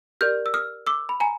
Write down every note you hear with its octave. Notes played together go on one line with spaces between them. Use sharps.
G4 A#4 D5 F6 G6
E6
D#6 F6
D6 E6
B5
G#5 A#5